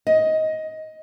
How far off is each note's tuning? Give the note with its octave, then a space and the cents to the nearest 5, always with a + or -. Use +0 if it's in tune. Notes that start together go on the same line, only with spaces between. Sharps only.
D#5 +15